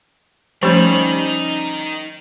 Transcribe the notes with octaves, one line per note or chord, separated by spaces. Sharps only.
F3 G3 A3 C#4 D#4 C5 C#5 G5